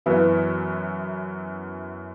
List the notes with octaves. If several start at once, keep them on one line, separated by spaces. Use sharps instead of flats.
F#2 E3 B3 E4